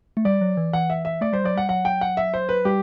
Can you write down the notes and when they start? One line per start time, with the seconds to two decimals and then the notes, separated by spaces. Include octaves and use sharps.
0.17 A3
0.25 G3 D5
0.41 F#3
0.57 E3
0.73 E3 F#5
0.90 E5
1.05 E5
1.21 A3 D5
1.33 G3 C5
1.44 F#3 D5
1.56 G3 F#5
1.69 F#3 F#5
1.85 G5
2.01 F#5
2.17 E5
2.34 C5
2.49 B4
2.65 G3 G4